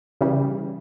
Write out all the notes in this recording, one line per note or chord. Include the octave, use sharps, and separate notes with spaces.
C#3 E3 G3